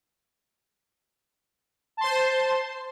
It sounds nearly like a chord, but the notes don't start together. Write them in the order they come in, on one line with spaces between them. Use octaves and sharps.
A5 C6 C5